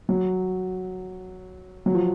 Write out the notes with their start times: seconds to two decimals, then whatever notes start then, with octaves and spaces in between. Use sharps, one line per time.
0.09 F#3
1.86 F#3
1.94 F3